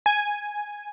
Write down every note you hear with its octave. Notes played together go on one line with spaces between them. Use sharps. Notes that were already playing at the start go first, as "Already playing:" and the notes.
G#5